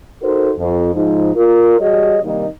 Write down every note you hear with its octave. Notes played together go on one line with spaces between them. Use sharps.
D#4 F#4 A4 A#4 C5
F2
G#2 F3 D#4
F4 A#4
G3 F#4 G#4 C#5 D#5
C3 D#3 G3 A#3 D#4